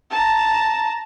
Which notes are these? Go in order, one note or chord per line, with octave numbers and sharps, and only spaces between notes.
A5 A#5